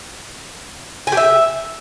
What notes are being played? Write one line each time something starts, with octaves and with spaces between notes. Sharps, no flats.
G#5
G4
E5